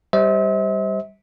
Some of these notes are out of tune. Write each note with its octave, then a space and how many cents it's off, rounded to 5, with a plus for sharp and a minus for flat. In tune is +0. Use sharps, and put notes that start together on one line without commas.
G3 +0 C5 +0 E5 -45